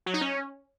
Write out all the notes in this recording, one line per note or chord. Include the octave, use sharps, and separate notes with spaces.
F#3
D#4
C#4